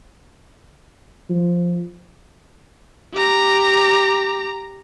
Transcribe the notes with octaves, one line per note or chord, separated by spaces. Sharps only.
F3
G4 A#5